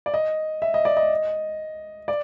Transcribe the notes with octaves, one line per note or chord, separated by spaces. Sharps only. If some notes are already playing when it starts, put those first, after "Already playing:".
D5
D#5
E5
D#5
D5
D#5
D5